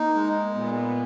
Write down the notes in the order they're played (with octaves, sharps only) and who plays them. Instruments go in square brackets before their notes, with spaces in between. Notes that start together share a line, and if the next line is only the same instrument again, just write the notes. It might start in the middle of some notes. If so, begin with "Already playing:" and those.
Already playing: [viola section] A#3 [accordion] D#4
[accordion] G#3
[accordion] A#2 [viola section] B3